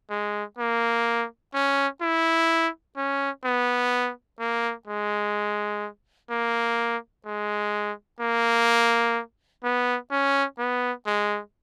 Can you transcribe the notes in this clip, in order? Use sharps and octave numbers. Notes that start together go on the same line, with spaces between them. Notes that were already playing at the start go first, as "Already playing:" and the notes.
G#3
A#3
C#4
E4
C#4
B3
A#3
G#3
A#3
G#3
A#3
B3
C#4
B3
G#3